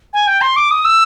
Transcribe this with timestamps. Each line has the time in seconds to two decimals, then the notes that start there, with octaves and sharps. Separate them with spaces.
0.13 G#5
0.27 G5
0.41 C6
0.56 D6
0.71 D#6
0.85 E6